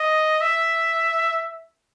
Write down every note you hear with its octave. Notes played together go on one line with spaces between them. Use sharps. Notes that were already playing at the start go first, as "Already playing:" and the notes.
Already playing: D#5
E5